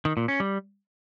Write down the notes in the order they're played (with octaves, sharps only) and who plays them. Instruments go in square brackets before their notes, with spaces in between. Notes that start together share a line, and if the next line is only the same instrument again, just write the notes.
[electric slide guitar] D#3
A#2
C#4
G3